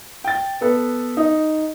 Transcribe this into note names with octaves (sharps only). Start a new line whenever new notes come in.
G5 A6
B3 A4 B4
D#4